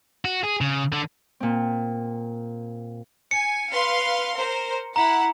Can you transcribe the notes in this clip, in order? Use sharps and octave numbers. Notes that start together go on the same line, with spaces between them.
F#4
G#4
C#3
D3
A#2 C4
G#5 C#7
B4 F5 C6
A#4 C5
E4 F#5 A#5